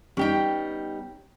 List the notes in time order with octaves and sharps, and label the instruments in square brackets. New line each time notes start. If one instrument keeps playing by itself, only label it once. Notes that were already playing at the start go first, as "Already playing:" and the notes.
[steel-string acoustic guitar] G3 B3 D#4 [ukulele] C#4 G4 G5